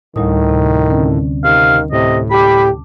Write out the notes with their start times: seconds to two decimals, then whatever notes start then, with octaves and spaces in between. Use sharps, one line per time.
0.16 D2 A2 D#3 G3 D#6
0.49 C3
0.90 D3 C4 C#4
1.44 C3 D#3 F5
1.92 A2 C3 D#5
2.31 G4 A5 B5 D6